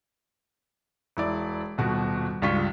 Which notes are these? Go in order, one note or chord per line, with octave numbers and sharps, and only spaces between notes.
E1 E4 D5
D#1 B2 F#4
C#2 G2 F4 C#6 B6